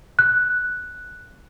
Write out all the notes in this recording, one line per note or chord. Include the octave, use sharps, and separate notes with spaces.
F#6